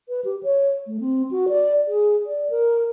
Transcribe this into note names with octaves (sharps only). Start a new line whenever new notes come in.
B4
G4
C#5
A3
C4
F#4
D5
G#4
D5
A#4